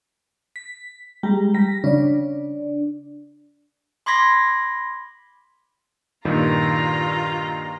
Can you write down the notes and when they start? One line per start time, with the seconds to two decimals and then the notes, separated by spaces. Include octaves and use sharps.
0.56 B6
1.23 G3 G#3 A#5
1.54 G3 A#6 B6
1.84 C#3 D4 D5
4.06 B5 C6 D6 G#6 A#6 B6
6.25 G2 A#2 D#3 F4 A#5